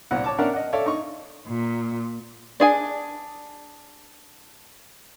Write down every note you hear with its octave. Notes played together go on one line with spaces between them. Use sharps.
C2 A#2 F#5
C#5 A5 D6
C#4 D4 A#4 D5 E5 F#5
D#5 F#5
A4 C#5 D5 E5 F5
D#4 C#6
A#2
D4 G#4 G#5